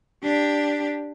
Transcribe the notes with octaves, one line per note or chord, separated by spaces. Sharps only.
D4 G4